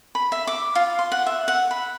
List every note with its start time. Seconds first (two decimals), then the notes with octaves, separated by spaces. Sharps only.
0.15 B5
0.32 E5
0.47 D6
0.75 F4
0.99 C6
1.12 F#5
1.27 E5
1.48 F#5
1.71 B5